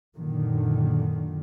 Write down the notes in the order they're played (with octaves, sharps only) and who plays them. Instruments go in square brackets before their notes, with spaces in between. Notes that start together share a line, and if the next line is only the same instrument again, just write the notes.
[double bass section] F#2 A#2 D3 D#3